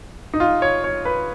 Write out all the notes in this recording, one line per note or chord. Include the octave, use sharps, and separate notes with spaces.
D#4
F4
C#5
C#5
B4